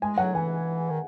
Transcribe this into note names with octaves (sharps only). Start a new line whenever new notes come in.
G#3 G#5
F#3 F#5
E3 G#5
D#3